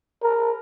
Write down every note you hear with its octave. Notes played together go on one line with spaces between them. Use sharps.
A#4